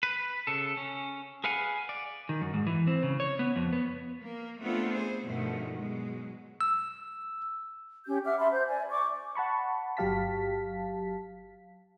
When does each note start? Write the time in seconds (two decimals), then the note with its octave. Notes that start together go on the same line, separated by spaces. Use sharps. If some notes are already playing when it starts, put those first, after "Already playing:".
0.03 B4
0.47 C#3 A4
0.77 C#4
1.44 G#4 B4 F5 F#5 G#5
1.89 D5
2.29 D#3
2.41 F#2
2.54 G#2
2.67 E3
2.87 C4
3.03 C#3
3.20 C#5
3.39 B3
3.56 F2
3.73 B3
4.20 A#3
4.61 A3 B3 C4 D4 F4 A4
4.90 G#4 C5
5.23 G2 B2 D3 D#3 F3 A3
5.75 B2 F#3 G#3
6.61 E6
8.07 C#4 G4 G6
8.24 E5 F#5 D6 F6
8.39 E5 A5 B5 C6
8.52 C5 G6
8.67 D5 G#5
8.91 D5 C#6 D6
9.35 F#5 A5 B5 C#6
9.97 G1 F#3 G4 F5 A5 B6